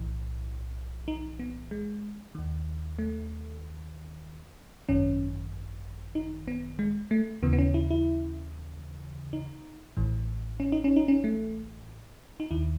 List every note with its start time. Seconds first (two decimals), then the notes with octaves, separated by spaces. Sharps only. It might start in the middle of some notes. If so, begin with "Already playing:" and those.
Already playing: B1 A2 E3
1.08 D#4
1.40 B3
1.71 G#3
2.35 D#2 D#3
2.99 A3
4.89 G#1 F#2 D#3 C#4
6.15 D#4
6.48 B3
6.79 G#3
7.11 A3
7.42 D#2 C#3 E3 B3
7.53 B3
7.59 C#4
7.74 E4
7.91 E4
9.33 D#4
9.97 A1 A2 E3
10.60 C#4
10.72 D#4
10.84 C#4
10.96 D#4
11.08 C#4
11.24 A3
12.40 D#4
12.51 D#2 D#3 E4